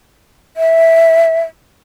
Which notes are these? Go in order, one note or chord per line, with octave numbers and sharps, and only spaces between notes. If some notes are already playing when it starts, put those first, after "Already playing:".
E5